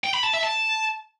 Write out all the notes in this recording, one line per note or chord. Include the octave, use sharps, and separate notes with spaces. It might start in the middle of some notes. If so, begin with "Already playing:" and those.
G5
B5
A5
E5
A5